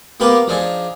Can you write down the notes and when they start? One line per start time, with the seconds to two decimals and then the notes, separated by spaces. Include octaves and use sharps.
0.20 A#3 B3 G4 A#4 B4
0.47 F3 D4 D#4 G#4